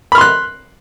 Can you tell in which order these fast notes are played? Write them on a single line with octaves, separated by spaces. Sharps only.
B5 F6 C6 F#6